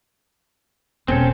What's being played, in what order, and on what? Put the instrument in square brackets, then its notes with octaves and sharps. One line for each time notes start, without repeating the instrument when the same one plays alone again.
[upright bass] E1 [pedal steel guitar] C4 C#4 A4